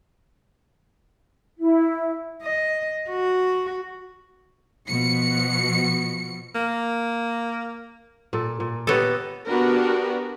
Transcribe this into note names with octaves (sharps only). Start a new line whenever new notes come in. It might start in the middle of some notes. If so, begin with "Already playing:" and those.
E4
D#5
F#4
B2 F3 C#7
A#3
A#2 A4
A#2
B3 G4 A4 C#5 D#5
B3 D4 F#4 G4 A#4 B4